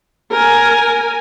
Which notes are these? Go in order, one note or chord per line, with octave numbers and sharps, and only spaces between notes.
A#4 G#5